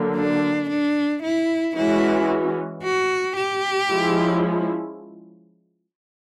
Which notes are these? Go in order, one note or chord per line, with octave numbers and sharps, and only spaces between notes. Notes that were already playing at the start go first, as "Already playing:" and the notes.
Already playing: D3 F#3 A#3
D4
D4
E4
E3 G#3 C#4 E4 F#4
F#4
G4
F3 G#3 C#4 E4